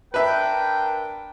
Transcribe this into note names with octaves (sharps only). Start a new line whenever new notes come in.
D4 A#4 B4 E5 G5